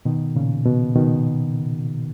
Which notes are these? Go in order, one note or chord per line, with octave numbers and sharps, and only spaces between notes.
B2 D#3
A#2 C#3
B2
B2 D#3